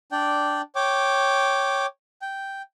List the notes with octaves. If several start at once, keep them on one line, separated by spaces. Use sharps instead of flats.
D4 D5 G5
C#5 G5 D6
G5